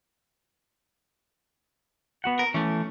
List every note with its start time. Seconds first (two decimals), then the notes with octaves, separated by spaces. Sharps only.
2.24 B3 F#4 F#5
2.39 A#4
2.54 E3 A3 C#4